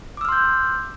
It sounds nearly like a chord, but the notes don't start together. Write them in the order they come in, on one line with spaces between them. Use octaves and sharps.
D6 E6 F6 C6 G6